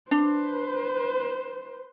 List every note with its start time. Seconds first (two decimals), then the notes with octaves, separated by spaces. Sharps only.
0.11 D4 B4 C5